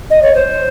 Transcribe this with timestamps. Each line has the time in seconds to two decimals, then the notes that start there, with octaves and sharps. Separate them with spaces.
0.10 D#5
0.22 C#5
0.34 C5